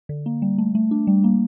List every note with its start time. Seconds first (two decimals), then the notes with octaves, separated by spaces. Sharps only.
0.09 D3
0.26 A#3
0.42 G3
0.58 A3
0.75 A3
0.91 D4
1.07 G3
1.24 A#3